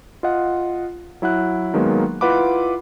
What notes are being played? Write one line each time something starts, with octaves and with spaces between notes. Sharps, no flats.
F4 D#5 F#5
F#3 E4 F#5 F#6
D#3 F#3 G#3 A#3 B3
E4 F4 B4 F#5 B5 D6